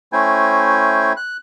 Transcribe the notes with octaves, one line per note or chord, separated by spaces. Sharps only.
A3 C#4 E4 C5 G5 G#5
F#6